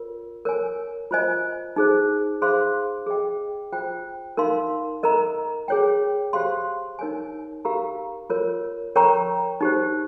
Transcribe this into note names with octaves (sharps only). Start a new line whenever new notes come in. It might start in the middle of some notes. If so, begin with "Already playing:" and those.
Already playing: F4 A#4 C#5
A#4 C#5 G#5
F4 C5 D#5 G#5
D#4 G#4 C5
G#4 C5 F5 C6
G#4 D#5 G5
F4 C5 G5
D#4 A#4 F5 C6
A#4 D#5 A#5
G#4 C#5 G5
G4 C5 F5 C6
D#4 A#4 C#5 G#5
G4 A#4 F5 A#5
F4 A#4 C#5
A#4 C#5 G5 A#5 C#6
D#4 G4 C5